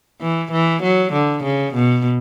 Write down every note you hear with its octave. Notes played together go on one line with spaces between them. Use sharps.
E3
E3
F#3
D3
C#3
B2